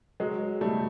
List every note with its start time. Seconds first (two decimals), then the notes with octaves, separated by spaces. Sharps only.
0.20 F#3 G#3
0.61 G3 A3